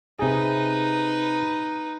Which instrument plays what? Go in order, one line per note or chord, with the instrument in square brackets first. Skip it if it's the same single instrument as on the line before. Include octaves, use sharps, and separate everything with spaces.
[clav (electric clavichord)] C3 G#4 [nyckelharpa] D#4 B4